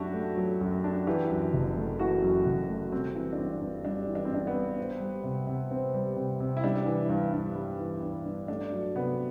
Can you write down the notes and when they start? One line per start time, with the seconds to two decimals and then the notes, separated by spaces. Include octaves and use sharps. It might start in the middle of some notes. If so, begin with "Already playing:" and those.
Already playing: F#2 F#3 A3 D4 E4 F#4 G4
0.14 A3
0.38 F#3
0.61 F#2
0.84 D4
1.07 E3 G4
1.30 F#2
1.53 F#1
1.77 A3
1.99 E3 F#4
2.22 F#2
2.46 F#1
2.69 A3
2.92 G3 C4
3.15 E3
3.33 D4
3.38 G2 C4
3.61 G2
3.85 G3 D4
4.08 E3
4.15 D4
4.25 C4
4.32 G2 D4
4.47 B3
4.54 G2
4.78 C4
5.00 G3
5.23 C3
5.47 C3
5.71 C4
5.94 G3
6.16 C3
6.40 C3
6.57 E4
6.63 G3 D4
6.86 E3
7.09 G2
7.33 G2
7.55 G3
7.79 E3
8.03 G2
8.25 G2
8.48 A3 D4
8.72 F#3
8.95 C3 B3